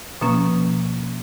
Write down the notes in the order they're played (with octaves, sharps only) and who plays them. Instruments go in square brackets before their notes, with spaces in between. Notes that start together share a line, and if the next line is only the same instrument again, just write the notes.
[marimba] B2 F3 A#3 C#4